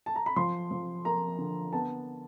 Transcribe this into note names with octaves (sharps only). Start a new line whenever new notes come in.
A5
A#5
B5
F3 C6
F3
A#3 A#5
D3
B3 A5